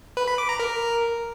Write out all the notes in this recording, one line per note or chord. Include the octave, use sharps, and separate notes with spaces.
B4
B5
D6
A#5
A#4